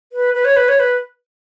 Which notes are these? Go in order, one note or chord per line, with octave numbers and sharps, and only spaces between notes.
B4
B4
C#5
B4
C#5
B4